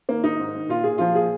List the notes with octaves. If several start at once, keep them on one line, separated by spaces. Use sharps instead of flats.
D#3 A#3
D#3 D#4
G#2
D#3
A#2 F4
A#2 G#4
F3 F4
A#2 G#4